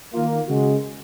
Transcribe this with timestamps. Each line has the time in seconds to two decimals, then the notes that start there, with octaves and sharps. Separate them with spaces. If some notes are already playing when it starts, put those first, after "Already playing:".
0.14 D#3 A#3 F4
0.48 C#3 G#3 F#4